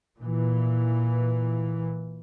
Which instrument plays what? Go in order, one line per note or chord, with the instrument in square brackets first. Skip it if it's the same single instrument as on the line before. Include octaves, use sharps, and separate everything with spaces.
[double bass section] A#2 E3